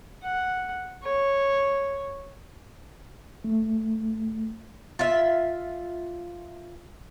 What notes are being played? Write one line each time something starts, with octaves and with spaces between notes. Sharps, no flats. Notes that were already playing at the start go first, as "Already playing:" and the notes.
F#5
C#5
A3
F4 E5